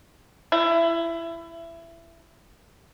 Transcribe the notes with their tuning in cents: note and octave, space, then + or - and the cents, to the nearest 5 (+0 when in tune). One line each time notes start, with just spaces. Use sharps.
E4 +20